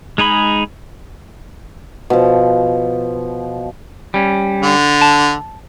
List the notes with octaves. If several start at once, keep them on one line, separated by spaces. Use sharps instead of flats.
G#3 D#4 G#4 B5
B2 F3
G3 C#4
D3
A5